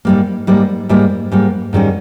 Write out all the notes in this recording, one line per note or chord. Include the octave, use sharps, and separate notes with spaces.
G#2 G3 A#3
G#2 G3 A#3
G#2 G3 A#3
G#2 G3 A#3
G#2 D#3 G3 C#4